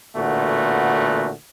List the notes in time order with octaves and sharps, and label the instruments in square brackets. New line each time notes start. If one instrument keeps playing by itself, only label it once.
[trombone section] A1 A#2 D3 A3 B3 F#4